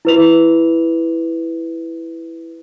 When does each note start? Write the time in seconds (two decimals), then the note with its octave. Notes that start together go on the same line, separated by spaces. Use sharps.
0.05 E4 B4 F7